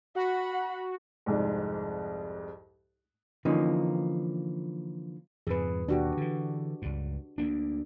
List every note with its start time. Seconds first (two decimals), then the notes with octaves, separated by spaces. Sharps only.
0.15 F#4 F#5 B5
1.26 C2 F2 G#2
3.45 D3 E3 F3 A#3 C#4 D#4
5.47 F2 G#2 C#3 G#4 B4
5.88 D#2 B2 D4 F#4 G4
6.17 D3 E3
6.82 C#2 G2
7.38 D2 A#3 D4